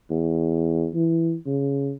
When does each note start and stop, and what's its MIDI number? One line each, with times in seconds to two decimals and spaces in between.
0.10 0.89 40
0.94 1.35 52
1.46 1.93 49